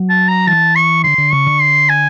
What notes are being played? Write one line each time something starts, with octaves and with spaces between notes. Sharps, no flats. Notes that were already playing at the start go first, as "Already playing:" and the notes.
Already playing: F#3
A5
A#5
E3 A5
C#6
D3 C6
D3
C#3 C#6
D3
C6
G#5